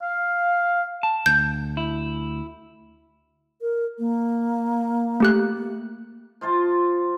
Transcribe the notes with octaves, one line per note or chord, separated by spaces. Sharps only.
F5
A5
D2 G6
E4
A#4
A#3
A3 G4 F#6
F3 F4 C5 A5